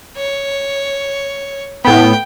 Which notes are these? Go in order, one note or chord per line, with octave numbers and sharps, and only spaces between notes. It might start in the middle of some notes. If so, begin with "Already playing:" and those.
C#5
A2 B3 G5